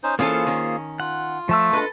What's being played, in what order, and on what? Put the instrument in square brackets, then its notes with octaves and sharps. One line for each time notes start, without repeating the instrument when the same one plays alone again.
[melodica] C#4 D#4 C5
[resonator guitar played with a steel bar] E3 C#4 A4 [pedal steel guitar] A#3 F4 C5 [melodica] G#4
[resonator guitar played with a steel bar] D#3 C#4
[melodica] F4 [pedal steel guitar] F#5
[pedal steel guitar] F3 A5 E6 [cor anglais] A3
[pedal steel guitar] D4 D#5 F#6 [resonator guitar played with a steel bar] A4 B4